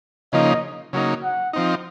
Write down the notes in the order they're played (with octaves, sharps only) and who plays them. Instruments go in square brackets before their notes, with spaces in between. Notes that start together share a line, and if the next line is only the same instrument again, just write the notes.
[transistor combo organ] C#3 F3 A#3 D#4 [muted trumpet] D#5
[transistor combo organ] C#3 F#3 A#3 D#4
[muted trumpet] F#5
[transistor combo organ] F3 C4 D#4